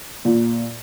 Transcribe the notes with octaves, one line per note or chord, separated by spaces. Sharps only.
A#2